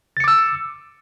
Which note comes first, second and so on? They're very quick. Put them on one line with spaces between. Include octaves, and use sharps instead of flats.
A6 C#7 D6 E6